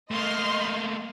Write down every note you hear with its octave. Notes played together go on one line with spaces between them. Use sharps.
A3 A#3 D#5 C6 F6